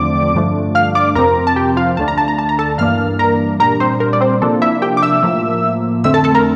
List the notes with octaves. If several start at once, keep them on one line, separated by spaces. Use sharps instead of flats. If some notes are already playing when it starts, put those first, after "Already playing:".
Already playing: E2 D3 F3 A3 C4 D5 D6
G2 D3 F3 A3 D4
F5 F6
D5 D6
F2 C3 F3 C4 A#4 A#5
A5
G4 G5
F4 F5
D2 D3 A3 D4 A5
A#5
A5
A#5
A5
A#5
A4 A5
G2 E3 A#3 D4 F5 F6
A#4 A#5
A#2 G3 D4 A#4 A#5
C4 C5
A#4
D5
C4 C5
C3 F3 A#3 D4 A4
E4 E5
G4 G5
D6
E5 E6
A2 F3 A#3
F2 D3 A3 C4 E5 E6
A4 A5
A4 A5
A#4 A#5